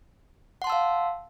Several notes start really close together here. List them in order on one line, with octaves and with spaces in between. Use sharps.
F#5 C6 A5 E6 F5